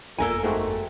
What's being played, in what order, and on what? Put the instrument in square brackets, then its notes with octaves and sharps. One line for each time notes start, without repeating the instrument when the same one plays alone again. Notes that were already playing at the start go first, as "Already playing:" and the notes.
[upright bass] G1 F2 [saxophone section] A#2 [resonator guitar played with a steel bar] A4 A#4 G#5
[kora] G#2 C4 F#4 [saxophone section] A3